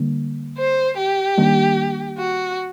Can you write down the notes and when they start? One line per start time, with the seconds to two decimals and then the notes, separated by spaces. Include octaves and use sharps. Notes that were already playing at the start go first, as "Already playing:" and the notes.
Already playing: D3 G3 A#3
0.57 C5
0.97 G4
1.38 D#3 G3 A#3 D4
2.18 F#4